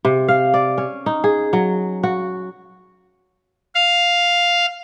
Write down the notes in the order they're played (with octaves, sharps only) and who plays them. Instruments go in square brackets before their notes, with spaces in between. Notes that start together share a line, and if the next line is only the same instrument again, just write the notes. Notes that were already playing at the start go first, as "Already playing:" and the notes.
[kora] C3
F5
D5
C#4
D#4
G#4
F#3
F#4
[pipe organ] F5